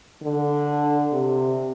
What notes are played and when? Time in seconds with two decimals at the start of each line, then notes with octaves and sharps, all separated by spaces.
0.23 D3
1.13 C3